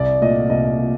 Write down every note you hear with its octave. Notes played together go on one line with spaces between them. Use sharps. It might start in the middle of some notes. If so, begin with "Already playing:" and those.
Already playing: C2 D5
A#2 A3 D#5
C2 D#5
A#2